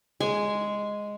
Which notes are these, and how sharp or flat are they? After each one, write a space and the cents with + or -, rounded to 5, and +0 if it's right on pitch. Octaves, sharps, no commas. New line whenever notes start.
G#3 +0 G#5 +0